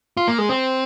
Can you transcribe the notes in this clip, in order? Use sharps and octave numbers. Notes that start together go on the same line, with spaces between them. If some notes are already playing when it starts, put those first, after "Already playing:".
F4
A#3
G#3
C4